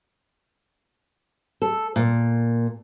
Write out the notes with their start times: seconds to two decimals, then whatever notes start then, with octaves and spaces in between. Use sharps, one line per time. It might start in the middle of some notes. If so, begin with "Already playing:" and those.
1.62 A4
1.96 A#2